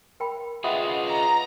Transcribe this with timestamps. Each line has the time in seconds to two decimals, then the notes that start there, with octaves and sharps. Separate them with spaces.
0.20 A#4 G5 B5
0.64 F4 G#4 B4 D#5 E5 F#5 G5
1.08 A#5